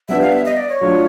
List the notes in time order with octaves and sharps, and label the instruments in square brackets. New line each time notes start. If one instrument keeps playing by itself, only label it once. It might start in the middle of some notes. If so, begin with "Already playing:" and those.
[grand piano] G3 B3 D4 G4 B4 [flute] E5
[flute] F5
E5
D#5
D5
C#5
[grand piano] F#3 A3 D4 F4